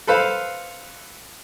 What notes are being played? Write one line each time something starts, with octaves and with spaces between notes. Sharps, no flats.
A4 B4 C5 F5